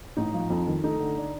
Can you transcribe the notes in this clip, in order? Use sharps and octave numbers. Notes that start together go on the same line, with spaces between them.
A1 D#4
F3
F2
D#3
A3 D#4
D3
D4